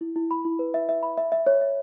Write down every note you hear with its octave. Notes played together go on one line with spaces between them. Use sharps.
E4
E4
B5
E4
B4
E5
E5
B5
E5
E5
C#5
E5